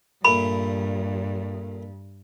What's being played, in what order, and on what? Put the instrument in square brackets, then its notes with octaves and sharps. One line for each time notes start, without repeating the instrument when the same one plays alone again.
[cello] G2 [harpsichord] A#2 A3 A#3 [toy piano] B5